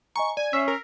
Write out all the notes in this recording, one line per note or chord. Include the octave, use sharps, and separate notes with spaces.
D#5 G#5 A#5 C#6
D5 G#5
C#4 E5 E6 B6 C7
A#4